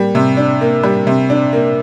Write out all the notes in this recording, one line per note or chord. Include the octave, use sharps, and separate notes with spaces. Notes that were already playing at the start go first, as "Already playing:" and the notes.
Already playing: G3 A#3
C3
D4
A#3
G3
C3
D4
A#3